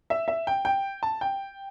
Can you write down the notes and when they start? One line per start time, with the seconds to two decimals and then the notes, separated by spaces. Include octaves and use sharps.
0.10 E5
0.28 E5
0.47 G5
0.65 G5
1.03 A5
1.21 G5